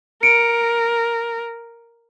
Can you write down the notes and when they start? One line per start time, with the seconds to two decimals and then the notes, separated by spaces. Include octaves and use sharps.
0.23 A#4 C#7 D7